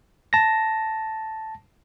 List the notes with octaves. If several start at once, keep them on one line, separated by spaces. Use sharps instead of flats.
A5 A#6